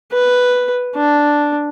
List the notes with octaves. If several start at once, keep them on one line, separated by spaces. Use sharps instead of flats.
B4
D4